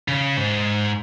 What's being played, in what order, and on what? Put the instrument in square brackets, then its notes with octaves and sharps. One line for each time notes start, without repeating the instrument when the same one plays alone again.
[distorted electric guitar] C#3
G#2